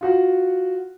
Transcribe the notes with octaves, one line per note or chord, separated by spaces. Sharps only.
F4 F#4 F#5